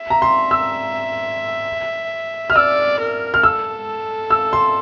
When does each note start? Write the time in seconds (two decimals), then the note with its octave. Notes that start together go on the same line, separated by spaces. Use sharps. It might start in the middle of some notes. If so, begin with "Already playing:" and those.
Already playing: E5
0.10 A#5
0.22 C6
0.51 E6
2.50 F6
2.55 D5 E6
3.00 A#4
3.34 F6
3.43 A4 E6
4.30 E6
4.53 C6